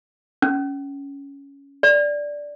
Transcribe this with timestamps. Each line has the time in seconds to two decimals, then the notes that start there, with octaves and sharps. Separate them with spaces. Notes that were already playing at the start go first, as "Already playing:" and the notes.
0.42 C#4
1.83 D5